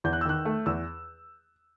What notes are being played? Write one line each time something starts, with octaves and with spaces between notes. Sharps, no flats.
E2 G6
F#6
E6
D#3 F#6
A3
E2 E6